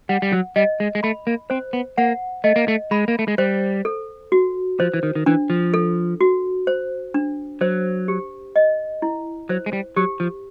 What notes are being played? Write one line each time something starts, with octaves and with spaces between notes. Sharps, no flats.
G3 F#5
G3
F#3
G3 D#5
G#3
G#3
A3 B5
A#3
C4 C5
B3
A#3 F#5
A3 D#5
A#3
A3
G#3 B5
A#3
A3
G#3
G3 C5
A4
F#4
F3 C5
E3
D#3
D#3
E3 D4
F3
A4
F#4
C5
D4
F#3 C5
G4
D#5
E4
F#3 C5
G#3
G3
F#3 G4
F3